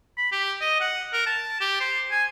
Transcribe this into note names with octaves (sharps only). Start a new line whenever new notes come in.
B5
G4
D#5
F#5
A#4
A5
G4
C5
G#5